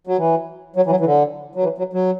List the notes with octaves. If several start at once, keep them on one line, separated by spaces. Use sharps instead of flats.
F#3
E3
F#3
E3
F#3
E3
D3
F#3
E3
F#3
F#3